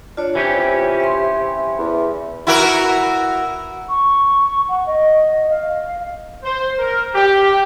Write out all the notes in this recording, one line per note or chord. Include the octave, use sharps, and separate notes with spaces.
D4 F4 C#5
C3 E3 C#4 G4
E5 C6
E2
E4 F#4 A#4
C#6
F#5
D#5
F5
C5
A#4
G4